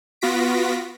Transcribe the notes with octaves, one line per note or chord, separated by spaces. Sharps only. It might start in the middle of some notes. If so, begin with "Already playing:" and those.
B3 F4 F#4 A#6 B6 D7